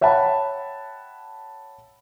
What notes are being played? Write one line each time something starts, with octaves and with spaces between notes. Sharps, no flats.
C#5 E5 F#5 G5 A5 B5